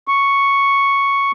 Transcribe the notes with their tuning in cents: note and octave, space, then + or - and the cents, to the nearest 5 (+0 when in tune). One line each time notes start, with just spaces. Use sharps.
C#6 +0